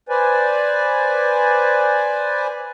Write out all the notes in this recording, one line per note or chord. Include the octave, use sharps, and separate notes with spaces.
B4 C5 D5 G#5